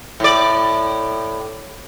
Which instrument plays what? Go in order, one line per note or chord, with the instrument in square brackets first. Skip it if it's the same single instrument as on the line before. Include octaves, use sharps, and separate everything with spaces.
[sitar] A2 D5